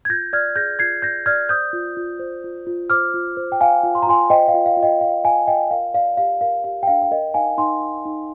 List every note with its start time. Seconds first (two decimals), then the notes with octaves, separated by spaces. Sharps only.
0.05 G#6
0.09 F4 G6 A#6
0.33 D5 F6 G#6
0.56 G#4 G6 A#6
0.79 F4 G#6 C7
1.02 D5 G6 A#6
1.26 D5 F6 G#6
1.49 C5 D#6 G6
1.73 F4
1.97 F4
2.19 C5
2.44 F4
2.67 F4
2.90 C5 D6 F6
3.14 F4
3.37 C5
3.52 G5
3.61 F4 F5 G#5
3.83 F4
3.95 C6
4.03 A#5
4.07 F4 G#5 C6
4.30 C5 D#5 G5
4.48 F5
4.54 F4
4.66 F5
4.77 F4
4.83 D#5 G5
5.00 F4 F5
5.24 F4 F5 G#5
5.47 F4 D#5 G5
5.71 A#4 F5
5.94 D5 F5
6.17 G4 F5
6.41 A#4 F5
6.64 G4 F5
6.83 G5
6.87 D4 F5
7.02 F5
7.11 A#4 D#5 G5
7.34 D#4 F5 G#5
7.58 D#4 G#5 C6
7.81 D#4
8.06 D#4